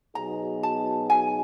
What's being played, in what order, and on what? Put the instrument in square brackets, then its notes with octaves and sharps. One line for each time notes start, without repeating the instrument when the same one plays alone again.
[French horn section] B2 F#3 B3 D#4 G#4 [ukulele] A#5
[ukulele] A5
G#5